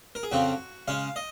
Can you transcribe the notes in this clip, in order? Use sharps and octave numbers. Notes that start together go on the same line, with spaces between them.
A#4
G#4
F2 C#3 F3 C4 F#4
C#3 G#3 C#4 F5
D#5